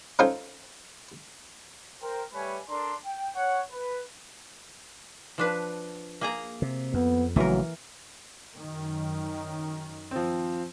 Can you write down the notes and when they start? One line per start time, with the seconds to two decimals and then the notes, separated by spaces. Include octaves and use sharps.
0.19 C#4 D#4 F4 A4 C5 G#5
2.02 A#4 C5 G5
2.33 G3 A3 B4 C#5 E5 G#5
2.69 D4 A4 A#4 D5 A#5 C6
3.05 G5
3.34 C#5 F#5
3.71 B4
5.38 F3 D4 B4
6.21 A#3 G#4 A#5
6.62 C3
6.94 F2 B3
7.36 A#1 C#3 E3 F#3 A3 A#4
8.54 F#2 D#3
10.11 F3 C4